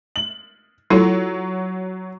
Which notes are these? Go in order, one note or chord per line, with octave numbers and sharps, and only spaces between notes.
F#7
F#3 E4 F4 A4